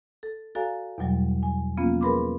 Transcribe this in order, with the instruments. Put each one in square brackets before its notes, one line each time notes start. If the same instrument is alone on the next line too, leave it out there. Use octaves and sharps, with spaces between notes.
[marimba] A4
F#4 A4 D5 F5 G#5 A#5
E2 B2 F#3 G3
G#5
F3 A#3 B3 C#4 F4
G#4 A#4 B4 B5 C6 D6